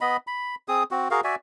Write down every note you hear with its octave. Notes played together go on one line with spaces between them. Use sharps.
B3 D#5 B5
B5
C4 G#4 D#6
C4 F#4
F#4 G#4 A#4 F5
F#4 D5 E5 G#5